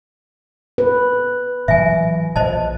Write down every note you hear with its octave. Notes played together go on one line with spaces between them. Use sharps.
B4
A#2 E3 F#3 E5 G#5
A#1 A#2 C5 D#5 A5